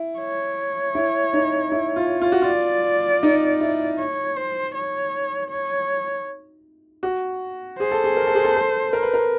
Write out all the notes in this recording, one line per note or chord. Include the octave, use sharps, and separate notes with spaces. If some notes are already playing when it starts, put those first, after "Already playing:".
Already playing: E4
C#5
E4
D#4
E4
F4
F4
F#4
F4
D5
D#4
E4
C#5
C5
C#5
C#5
F#4
G#4 C5
A4
G#4
A#4
A4
G#4
A4
A4
A#4
B4
A#4